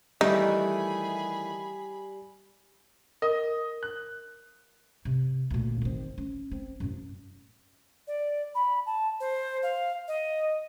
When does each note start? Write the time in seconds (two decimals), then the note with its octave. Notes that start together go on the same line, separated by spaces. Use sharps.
0.21 D#3 E3 G3 A3 D#4 G#4 B5
3.22 A#4 D#5 D#6
3.83 F#6
5.05 C3
5.50 D2 A#2
5.82 D#3 C4
6.18 C#4
6.51 C4
6.80 F#2 A2
8.07 D5
8.55 B5
8.86 A5
9.20 C5
9.63 F5
10.08 D#5